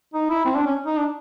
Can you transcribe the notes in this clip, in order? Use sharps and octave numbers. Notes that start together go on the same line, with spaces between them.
D#4
E4
C4
D4
C#4
D#4
D4